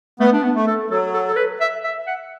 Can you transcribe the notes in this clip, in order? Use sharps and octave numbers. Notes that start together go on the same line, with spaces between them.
A3 B3
D4
B3
A3
A4
F#3 A4
A4
A4
B4
E5
E5
F#5